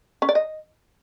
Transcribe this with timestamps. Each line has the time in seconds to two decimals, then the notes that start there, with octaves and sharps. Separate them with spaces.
0.22 C#4
0.29 D5
0.35 D#5